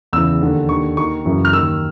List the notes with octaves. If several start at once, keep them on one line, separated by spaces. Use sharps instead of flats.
E2 C#3 E3 E6
D#2 D3
D#2 D3 C#6
D#2 D#3 C#6
F#2 C#3 E3
F6
D#2 D#3 E6